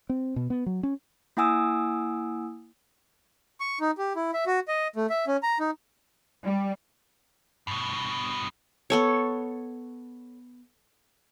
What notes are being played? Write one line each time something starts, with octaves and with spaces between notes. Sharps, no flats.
C4
B2
B3
F#3
C#4
A#3 E4 F#5 G#5 D#6 E6
C#6
D#4
G4
E4
E5
F#4
D#5
A3
E5
C#4
A#5
D#4
G3
G2 B2
B3 A4 C#5